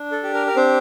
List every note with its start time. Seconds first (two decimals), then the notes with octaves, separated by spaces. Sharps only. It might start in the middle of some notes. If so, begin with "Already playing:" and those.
Already playing: D4
0.11 A4
0.23 G4
0.34 A#4
0.47 A#4
0.56 C4 D4 C5